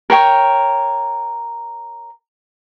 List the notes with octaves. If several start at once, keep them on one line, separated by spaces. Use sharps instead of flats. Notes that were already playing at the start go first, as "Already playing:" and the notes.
A#4 C#5 G5